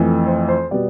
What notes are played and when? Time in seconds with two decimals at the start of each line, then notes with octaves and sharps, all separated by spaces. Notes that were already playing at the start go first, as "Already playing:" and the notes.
Already playing: F2 E3 A3
0.27 C5
0.48 C5
0.71 B2 G3 B3 D5